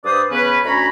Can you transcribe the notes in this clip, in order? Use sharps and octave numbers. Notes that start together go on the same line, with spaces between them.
G2 B4 C5 D5 D#6
C#3 E3 B3 C#4 B4
D2 C#4 F#4 C#5 A#5 B5